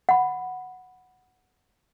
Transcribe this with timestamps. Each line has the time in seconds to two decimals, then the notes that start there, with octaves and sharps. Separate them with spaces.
0.09 F#5 B5